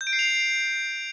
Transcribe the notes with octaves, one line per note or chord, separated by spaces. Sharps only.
G6
D7
C7
F7
D7